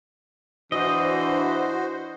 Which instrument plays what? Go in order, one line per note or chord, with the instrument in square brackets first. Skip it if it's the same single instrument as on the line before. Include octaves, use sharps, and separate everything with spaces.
[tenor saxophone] E3 [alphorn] D4 [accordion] F#4 C5 [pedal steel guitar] D#5